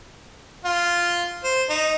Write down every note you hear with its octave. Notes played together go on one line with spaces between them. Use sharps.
F4
C5
D#4